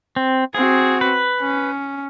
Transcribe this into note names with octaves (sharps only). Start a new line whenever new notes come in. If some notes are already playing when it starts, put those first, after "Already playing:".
C4
C4 F#4 G#4
B4
C#4